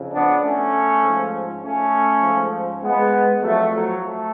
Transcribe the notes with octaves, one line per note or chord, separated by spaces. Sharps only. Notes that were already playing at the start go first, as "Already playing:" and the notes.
Already playing: F2 C#3
B3 D4
A3 C#4
G#2 F3
A3 C#4
G#2 F3
G#3 B3
F2 F3 F#3 A3
F#3
A3